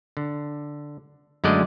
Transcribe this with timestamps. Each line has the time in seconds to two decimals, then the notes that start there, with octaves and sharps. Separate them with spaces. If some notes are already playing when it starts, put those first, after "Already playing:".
0.17 D3
1.44 F#2 D3 G#3 A3 D5 D#5